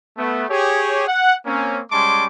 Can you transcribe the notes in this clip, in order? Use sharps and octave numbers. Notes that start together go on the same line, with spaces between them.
A3 B3
G4 G#4 C#5
F#5
A#3 C4 C#4
G3 G#3 C#4 A5 C6 D6